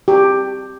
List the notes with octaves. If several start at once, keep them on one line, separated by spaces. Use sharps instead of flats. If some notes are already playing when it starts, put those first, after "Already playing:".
G4